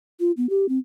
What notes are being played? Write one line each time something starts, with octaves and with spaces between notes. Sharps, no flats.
F4
B3
G4
C4